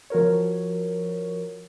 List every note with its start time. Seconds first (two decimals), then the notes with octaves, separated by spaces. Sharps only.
0.10 F3 F#4 A#4 C#5